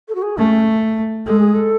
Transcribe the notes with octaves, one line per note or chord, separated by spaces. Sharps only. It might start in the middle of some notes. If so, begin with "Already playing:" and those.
A4
F#4
G#4
A3 C#4
G#3 A4
G#4
A4